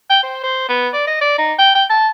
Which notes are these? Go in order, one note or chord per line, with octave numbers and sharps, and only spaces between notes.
G5
C5
C5
B3
D5
D#5
D5
D#4
G5
G5
A5